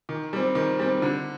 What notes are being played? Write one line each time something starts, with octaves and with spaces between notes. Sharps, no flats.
D#3
G3 C4
D#3
G3 C4
D3